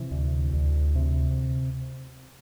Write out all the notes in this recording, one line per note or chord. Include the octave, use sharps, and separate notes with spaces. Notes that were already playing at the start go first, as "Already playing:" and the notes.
Already playing: C3 E3
D2
D2
C3